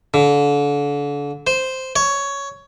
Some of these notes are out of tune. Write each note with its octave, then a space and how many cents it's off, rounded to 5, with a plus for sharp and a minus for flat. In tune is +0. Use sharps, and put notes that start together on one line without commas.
D3 -35
C5 -5
C#5 +10